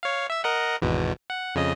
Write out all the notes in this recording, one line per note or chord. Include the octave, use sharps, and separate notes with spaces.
C#5 F5
E5 E6
A#4 D#5 F#5
G#1 E2 B2
F#5
F2 C#3 D#5